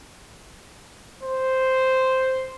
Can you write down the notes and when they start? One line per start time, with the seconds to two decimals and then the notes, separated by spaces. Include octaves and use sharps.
1.23 C5